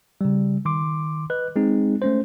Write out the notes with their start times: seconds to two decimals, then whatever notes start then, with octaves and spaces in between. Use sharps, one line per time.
0.21 C#3 G3
0.65 D#3 C6 D6
1.30 B4 D#5 F#6
1.56 G#3 C4 D#4 G#4
2.02 A3 C#4 C5